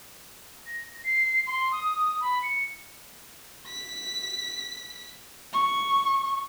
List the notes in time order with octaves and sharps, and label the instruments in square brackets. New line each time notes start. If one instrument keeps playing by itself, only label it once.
[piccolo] A#6
C7
C6
D#6
B5
C#7
[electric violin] B6
C#6